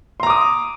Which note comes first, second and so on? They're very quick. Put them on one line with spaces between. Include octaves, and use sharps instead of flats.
C6 A#5 D6 D#6